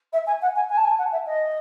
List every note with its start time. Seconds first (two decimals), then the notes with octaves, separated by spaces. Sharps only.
0.13 E5
0.27 G#5
0.41 F#5
0.55 G#5
0.69 G#5
0.77 A5
0.84 G#5
0.98 F#5
1.12 E5
1.26 D#5